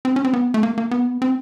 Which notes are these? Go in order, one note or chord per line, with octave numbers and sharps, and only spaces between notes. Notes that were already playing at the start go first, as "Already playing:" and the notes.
C4
C#4
C4
B3
A3
A#3
A#3
B3
C4